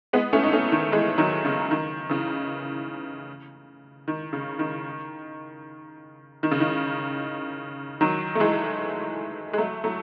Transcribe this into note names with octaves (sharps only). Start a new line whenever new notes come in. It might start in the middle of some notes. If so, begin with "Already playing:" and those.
G#3 B3
A3 C#4
D#4
A3 C#4
D#3
E3 G#3
D#3 F#3
C#3
D#3
C#3 E3
D#3
C#3
D#3
D#3
C#3
D#3
D#3 F#3
A3
E3 G#3
G#3
F#3 A3
F#3 A3